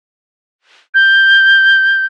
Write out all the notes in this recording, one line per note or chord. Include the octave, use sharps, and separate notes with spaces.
G6